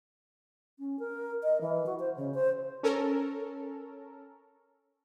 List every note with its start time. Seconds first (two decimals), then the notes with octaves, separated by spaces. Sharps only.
0.79 C#4
0.99 A#4
1.43 D#5
1.61 E3
1.86 F#4
2.00 C5
2.16 C#3
2.34 C5
2.83 C#4 A4 A#4